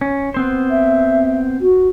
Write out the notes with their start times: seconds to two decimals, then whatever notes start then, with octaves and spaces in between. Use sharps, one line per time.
0.01 C#4
0.34 B3 C4 C5
0.71 E5
1.61 F#4